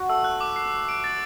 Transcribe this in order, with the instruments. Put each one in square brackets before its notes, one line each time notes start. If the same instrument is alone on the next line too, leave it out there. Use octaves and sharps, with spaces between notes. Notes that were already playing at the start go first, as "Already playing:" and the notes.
Already playing: [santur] F#4
[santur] A3 [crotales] E6
[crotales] F#6
D6
C7
D6
D7
A6